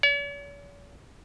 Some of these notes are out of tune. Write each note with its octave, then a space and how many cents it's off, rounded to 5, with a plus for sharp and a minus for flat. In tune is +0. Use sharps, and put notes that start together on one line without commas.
C#5 +45